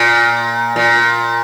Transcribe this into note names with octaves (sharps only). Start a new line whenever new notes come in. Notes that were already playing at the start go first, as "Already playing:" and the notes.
Already playing: A#2
A#2